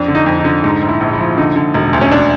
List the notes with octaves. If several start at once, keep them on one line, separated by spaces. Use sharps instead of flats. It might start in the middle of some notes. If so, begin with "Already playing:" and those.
Already playing: F2 D4
D3
D#4
F2
D#4
D3
G#2 D#4
A#1
E4
A#1
E4
F3
D3 D#4
D3
E1
D2
C#4
D4